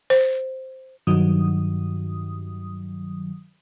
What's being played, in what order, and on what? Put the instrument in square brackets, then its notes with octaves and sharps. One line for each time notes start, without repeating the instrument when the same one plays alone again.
[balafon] C5
[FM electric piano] G2 D#3 F#3 D#6